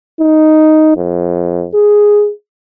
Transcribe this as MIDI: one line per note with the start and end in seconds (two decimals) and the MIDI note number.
0.21 0.94 63
0.97 1.67 41
1.74 2.31 68